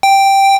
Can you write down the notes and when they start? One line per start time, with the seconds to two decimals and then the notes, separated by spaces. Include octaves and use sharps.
0.03 G5